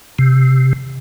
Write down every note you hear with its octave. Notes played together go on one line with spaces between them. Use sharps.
C3